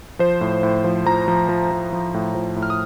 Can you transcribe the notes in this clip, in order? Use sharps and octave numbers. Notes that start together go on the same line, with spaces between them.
F3 C5
A2
A2
F3
F3 A#5
F3
F3
F3
F3
A2
F3
A2
F6
D#6